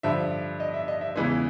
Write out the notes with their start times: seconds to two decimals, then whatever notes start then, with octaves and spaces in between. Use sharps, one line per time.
0.03 G2 D3 F3 E5
0.60 D#5
0.74 E5
0.88 D#5
1.01 E5
1.16 E2 C#3 E3 G#3